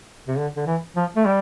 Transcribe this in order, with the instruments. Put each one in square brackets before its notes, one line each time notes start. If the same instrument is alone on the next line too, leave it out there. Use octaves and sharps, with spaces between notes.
[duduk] C3
D3
D3
E3
F3
A3
G3